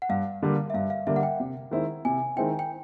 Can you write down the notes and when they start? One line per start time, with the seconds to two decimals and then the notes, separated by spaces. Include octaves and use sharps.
0.02 F#5
0.09 G2 F5
0.42 D3 G3 A#3
0.70 E5
0.74 G2 F5
0.90 F5
1.07 D3 G3 A#3 E5
1.16 F#5
1.23 G5
1.40 C3
1.71 D#3 G#3 C4 E4
2.05 C3 G#5
2.36 D#3 G#3 C4 E4 G5
2.59 G5